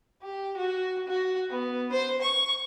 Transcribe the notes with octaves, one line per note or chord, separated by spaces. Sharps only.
G4
F#4
F#4
B3
C5
C#6